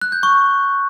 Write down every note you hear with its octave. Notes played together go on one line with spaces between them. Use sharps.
F#6
G6
C#6